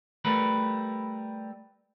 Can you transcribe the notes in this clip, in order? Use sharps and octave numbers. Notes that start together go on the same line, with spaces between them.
G3 A3 A#4 B4